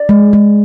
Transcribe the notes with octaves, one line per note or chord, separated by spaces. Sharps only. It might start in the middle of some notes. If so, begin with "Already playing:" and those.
Already playing: D5
G#3
G#3